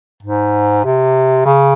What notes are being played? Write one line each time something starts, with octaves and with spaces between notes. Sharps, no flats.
G#2
C3
C#3